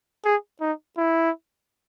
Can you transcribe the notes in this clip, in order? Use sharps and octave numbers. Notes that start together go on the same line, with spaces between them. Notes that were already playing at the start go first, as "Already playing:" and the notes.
G#4
D#4
E4